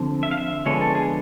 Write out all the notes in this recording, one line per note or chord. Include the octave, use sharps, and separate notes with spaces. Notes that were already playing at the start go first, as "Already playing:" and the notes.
Already playing: D3 F3 C4
E5
F5
E5
D3 F3 G#3 B3 C#5
A4
G#4